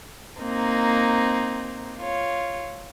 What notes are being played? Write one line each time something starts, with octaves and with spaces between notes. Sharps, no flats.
A#3 C4 D#4
F4 C#5